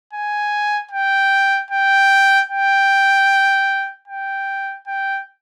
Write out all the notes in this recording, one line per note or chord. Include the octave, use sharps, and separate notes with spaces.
G#5
G5
G5
G5
G5
G5